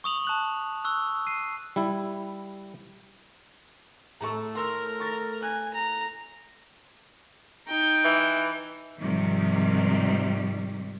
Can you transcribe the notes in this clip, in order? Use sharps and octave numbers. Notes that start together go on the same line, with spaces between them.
C#6 D#6 F7 F#7
A5 F#6 F#7
C#6 E6 F#6
C7 D#7
G3 E4
A2 A3 A4 A#5 C#6
A#4 C6 E6
C#6 A6 A#6
G#5 F#6
A#5
D#4 G5
E3
G#2 C3 D#3 F3 G3